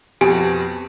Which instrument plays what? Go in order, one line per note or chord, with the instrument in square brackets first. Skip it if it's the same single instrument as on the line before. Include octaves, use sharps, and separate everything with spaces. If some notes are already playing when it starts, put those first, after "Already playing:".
[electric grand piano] F2 B2 [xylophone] G4 G#5